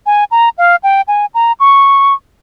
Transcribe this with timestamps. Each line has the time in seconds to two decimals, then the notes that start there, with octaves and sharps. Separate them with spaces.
0.06 G#5
0.31 A#5
0.58 F5
0.83 G5
1.08 G#5
1.34 A#5
1.60 C#6